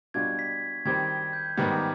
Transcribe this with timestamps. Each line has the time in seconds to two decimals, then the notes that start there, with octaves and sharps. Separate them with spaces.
0.14 B2 G3 D4 F4 G#6
0.39 B6
0.85 D#3 G3 C4 G4 G#6
1.33 G6
1.57 G#2 D#3 G3 B3 F6
1.69 D6